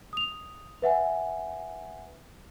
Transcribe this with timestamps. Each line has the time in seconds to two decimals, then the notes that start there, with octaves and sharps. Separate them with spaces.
0.13 D#6 F7
0.82 B4 E5 F#5 G#5